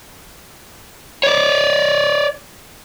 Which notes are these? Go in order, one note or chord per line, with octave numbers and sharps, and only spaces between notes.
C#5 D5